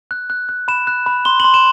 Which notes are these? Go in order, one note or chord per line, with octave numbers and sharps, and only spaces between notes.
F#6
F#6
F#6
B5 E7
F#6
B5
C6 G7
C6 F#7
E7